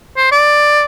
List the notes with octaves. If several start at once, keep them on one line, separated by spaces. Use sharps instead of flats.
C5
D5